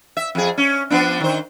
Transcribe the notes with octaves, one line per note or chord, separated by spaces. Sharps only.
E5
F2 G#4
C#4
F3 B3 D4
D#3 C5